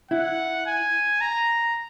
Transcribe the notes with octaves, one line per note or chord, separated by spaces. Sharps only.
E4 F#5
G#5
A#5